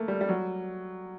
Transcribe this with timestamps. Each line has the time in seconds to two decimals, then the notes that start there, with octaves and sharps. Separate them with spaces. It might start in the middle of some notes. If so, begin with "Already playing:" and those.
Already playing: A3 A#3
0.08 G3
0.21 G3
0.29 F#3